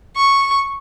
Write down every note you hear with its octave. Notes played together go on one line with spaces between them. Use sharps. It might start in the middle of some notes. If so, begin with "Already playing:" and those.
C#6